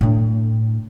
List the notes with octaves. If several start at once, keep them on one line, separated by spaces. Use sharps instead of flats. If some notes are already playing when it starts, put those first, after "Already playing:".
A2 D4